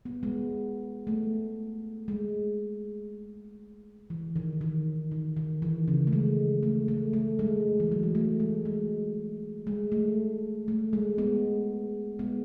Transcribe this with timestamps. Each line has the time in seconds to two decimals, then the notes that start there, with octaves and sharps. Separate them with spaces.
0.05 B3
0.23 G#3 B3
1.07 A3
2.08 G#3
4.10 E3
4.36 D#3
4.61 D#3
5.11 D#3
5.36 D#3
5.62 E3
5.88 C#3
6.07 A3
6.13 G#3
6.63 A3
6.88 A3
7.13 A3
7.39 G#3
7.80 E3
7.91 F#3
8.03 G#3
8.15 A3
8.40 G#3
8.65 G#3
9.67 G#3
9.92 A3
10.68 A3
10.93 G#3
11.18 G#3 B3
12.19 G#3 B3